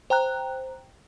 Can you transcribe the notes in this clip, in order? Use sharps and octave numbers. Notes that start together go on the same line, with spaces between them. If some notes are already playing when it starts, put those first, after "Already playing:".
C5 G5 A#5 F#6